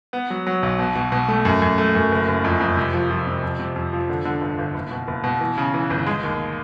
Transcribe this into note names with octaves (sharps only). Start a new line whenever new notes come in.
B3
F#3
F#3
B1
B2
B2
B2
A3
F#2
F#2
A3
F#2
F#1
F#1
F2
F2
C3
F3
F3
C3
F2
C3
F2
F3
D3
D3
G1
G1
F#1
B2
F#1
B2
E3
C#3
E3
G1
G#3
D#2